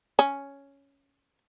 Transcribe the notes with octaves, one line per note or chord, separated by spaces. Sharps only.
C#4